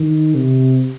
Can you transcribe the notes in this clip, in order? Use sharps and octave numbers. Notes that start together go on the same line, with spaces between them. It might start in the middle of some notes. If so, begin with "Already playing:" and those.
Already playing: D#3
C3